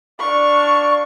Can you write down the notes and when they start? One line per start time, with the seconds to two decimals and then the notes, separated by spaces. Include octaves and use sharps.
0.19 D4 D5 F5 C#6